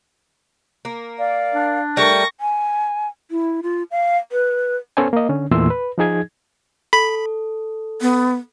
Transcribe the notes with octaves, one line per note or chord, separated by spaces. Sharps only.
A#3
D5 F5
D4
G3 A3 A#4 C#6 A#6
G#5
E4
F4
F5
B4
B3 C#4 A4 C5 C#5 G#5
A#3 D#5
D3 C#4
E2 A#2 E3 A3 C6 E6
B4
F3 D#4 G#4 G#6
A4 B5
B3